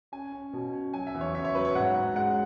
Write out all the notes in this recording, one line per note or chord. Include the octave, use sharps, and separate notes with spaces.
C#4 G#5
C#4
B2
C#4
F#3 G#5
E5
E2
C#5
C#3 E5
C#5
F#3 B4
C#5
G#2 F#5
G#2
G#3 F#5